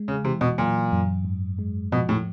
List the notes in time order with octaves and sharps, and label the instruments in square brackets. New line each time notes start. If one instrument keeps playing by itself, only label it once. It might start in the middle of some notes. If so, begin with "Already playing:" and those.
Already playing: [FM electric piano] G#3
[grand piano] C#3
[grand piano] C3 [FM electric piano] E3
[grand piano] B2
[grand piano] A#2 [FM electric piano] F#3
[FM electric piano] F#2
G#2
G#3
[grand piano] B2 [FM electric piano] F3
[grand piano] A2